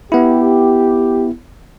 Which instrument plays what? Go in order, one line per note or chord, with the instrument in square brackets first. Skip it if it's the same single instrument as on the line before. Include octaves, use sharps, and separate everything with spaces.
[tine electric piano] B3 E4 [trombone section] G4